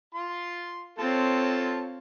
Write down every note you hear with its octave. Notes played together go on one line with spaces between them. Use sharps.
F4 C6
C4 F4 A4 C#5 A5